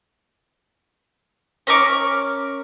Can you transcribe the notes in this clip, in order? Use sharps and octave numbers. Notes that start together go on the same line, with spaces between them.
C#4 A#4 C#6 D6